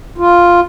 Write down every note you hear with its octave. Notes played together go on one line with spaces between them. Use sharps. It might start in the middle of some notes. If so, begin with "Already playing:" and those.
F4